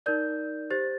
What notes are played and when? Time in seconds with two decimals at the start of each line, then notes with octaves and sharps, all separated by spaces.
0.06 D#4 A#4 D5 G6
0.70 G4 C5 A6